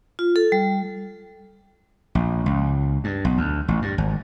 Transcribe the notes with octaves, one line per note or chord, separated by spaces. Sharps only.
F4
A4
G3
A#1
C#2
G2
B1
D2
A1
G2
G#1